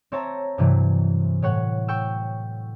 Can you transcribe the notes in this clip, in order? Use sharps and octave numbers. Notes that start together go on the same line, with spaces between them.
C4 C#5 E5 A5 A#5
G2 C3 E3 F#3
A2 C#5 F#5
G5 C#6 E6